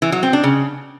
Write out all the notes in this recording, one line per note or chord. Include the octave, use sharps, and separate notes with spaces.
E3
F#3
C4
D4
C#3